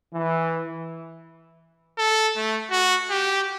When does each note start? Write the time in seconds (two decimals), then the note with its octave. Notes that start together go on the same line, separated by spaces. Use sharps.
0.14 E3
1.98 A4
2.37 A3
2.71 F#4
3.10 G4